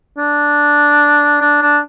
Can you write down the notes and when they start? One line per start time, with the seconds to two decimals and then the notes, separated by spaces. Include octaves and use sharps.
0.18 D4
1.41 D4
1.62 D4